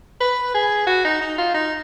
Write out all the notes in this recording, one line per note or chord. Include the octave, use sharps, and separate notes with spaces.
B4
G#4
F#4
D#4
D#4
F4
D#4